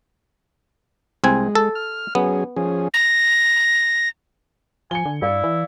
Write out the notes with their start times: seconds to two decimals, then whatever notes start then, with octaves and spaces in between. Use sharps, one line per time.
1.24 C2 G#3 C4 G#5
1.55 A4
1.75 F6
2.15 F#3 B3 C#4 G#4
2.56 F3 C#4 G#4
2.94 A#6
4.91 F3 G#5 C#7 G7
5.05 D3
5.22 G2 E4 D5 F5
5.44 E3